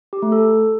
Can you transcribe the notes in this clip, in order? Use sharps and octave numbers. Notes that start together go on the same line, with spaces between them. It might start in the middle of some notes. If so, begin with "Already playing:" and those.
G4
A3
A4